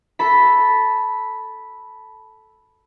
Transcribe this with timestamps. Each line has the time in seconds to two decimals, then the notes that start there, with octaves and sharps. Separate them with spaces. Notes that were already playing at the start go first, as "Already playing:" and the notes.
0.19 A4 A5 B5